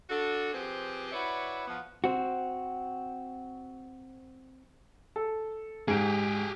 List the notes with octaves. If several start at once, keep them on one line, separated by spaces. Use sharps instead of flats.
D4 F#4 A4
F3 C4 G4 G#4 B4 C5
E4 F#4 B4 C#5 D5 E5
F3 B3
C4 F#4
A4
G#2 G4 G#4 D7